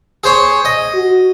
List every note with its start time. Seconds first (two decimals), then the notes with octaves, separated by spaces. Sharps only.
0.24 G#4 C5 C#5
0.65 D#5
0.94 F#4